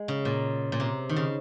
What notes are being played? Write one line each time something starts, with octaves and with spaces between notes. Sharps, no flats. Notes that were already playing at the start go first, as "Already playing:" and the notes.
Already playing: G#3
C#3
A#2
A#2
C3
D#3
C#3